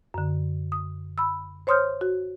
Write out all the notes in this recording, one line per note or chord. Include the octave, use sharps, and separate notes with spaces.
F#2 D3
D#6
B5 E6
C5 C#5 C6 D#6 F6 G6
F#4